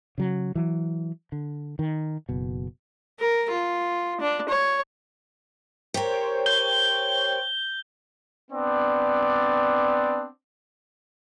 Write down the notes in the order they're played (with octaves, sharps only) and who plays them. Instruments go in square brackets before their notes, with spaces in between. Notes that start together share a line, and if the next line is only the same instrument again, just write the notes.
[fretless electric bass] C#3 F#3
E3 F#3
D3
D#3
F#1 B2
[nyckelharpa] A#4
F4
D4
C#5
[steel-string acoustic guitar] G4 A#4 [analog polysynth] C5 C#5 G5
[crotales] G6 G7
[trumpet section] B3 C4 D4 D5